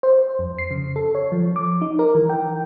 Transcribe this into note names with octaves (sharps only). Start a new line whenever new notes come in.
C5
F2
C7
C#3
A4
C#5
F3
D6
D#4
A#4
E3
G5